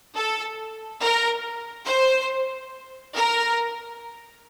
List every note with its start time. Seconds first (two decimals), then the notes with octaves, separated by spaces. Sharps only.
0.15 A4
1.00 A#4
1.85 C5
3.15 A#4